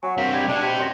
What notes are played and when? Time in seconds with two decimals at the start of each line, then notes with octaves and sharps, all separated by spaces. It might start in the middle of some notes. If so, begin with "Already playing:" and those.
0.03 F#3 F#5 G#5 C#6
0.17 G2 A#3 C4 F#5 B6
0.34 G3 G6 G#6
0.49 B2 B3 D4 A5 F#6
0.62 C3 G4 G5 G#6 B6
0.80 F#2 C6 A#6